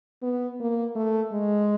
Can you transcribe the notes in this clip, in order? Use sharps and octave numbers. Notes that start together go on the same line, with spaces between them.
B3
A#3
A3
G#3